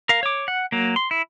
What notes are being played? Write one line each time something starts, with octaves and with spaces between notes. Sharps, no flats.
A#4 F5
C#5 D6
F#5
F#3 A#3
C6
E4